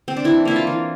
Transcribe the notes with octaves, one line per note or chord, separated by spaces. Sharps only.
C4
D4
E3 E4
A#3 E4
F4
E3